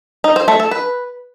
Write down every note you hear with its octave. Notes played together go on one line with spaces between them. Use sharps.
D#4
C5
A3
A4
B4